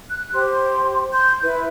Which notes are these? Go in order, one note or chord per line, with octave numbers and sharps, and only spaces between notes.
F#6
G4 C5 C6
C6 G6
E4 B4